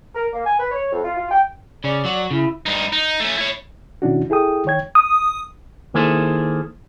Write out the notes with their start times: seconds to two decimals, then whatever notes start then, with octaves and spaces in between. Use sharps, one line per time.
0.15 A#4
0.33 A#3
0.45 G#5
0.59 B4
0.72 C#5
0.92 F2
1.04 F4
1.17 F4
1.31 G5
1.84 C#3 C#4 D5
2.05 F#3 F#4
2.31 C#3 E4
2.66 G2 D#4
2.92 D#4
3.20 A3 C#4
3.38 E4 C#5
4.02 B2 D#3 C#4 D4 E4 F#4
4.30 E4 G#4 A4 G5 D#6
4.66 D#3 C#5 G5 G#6
4.95 D#6
5.94 D#3 A#3 E4 G#4 A4 C5